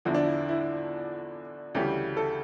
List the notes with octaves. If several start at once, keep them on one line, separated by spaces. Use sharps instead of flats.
E2 D3 F3 E4
D4
E4
E4
D2 C#3 E3 G3 G4
A4